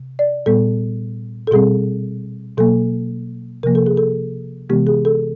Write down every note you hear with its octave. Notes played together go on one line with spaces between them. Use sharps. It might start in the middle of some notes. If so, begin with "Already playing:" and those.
Already playing: C3
D5
A#2 G3 B3 A4
A4
B2 G3 C4 G#4
B2 F#3 A#3 A4
C3 F3 A#3 A#4
A4
G#4
A4
C3 E3 G#3 B3 G4
G#4
A4